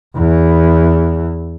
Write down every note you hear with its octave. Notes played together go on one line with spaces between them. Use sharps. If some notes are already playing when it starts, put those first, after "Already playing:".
E2 E3